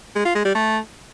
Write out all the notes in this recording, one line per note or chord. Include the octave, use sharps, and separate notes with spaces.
G#3
F4
G#3
G3
A3